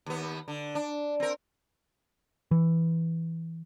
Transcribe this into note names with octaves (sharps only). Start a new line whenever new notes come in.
D#2 B3
D3
D4
C4 A#4
E3